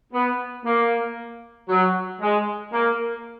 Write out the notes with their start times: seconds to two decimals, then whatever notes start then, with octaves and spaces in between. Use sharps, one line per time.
0.13 B3
0.65 A#3
1.69 F#3
2.21 G#3
2.73 A#3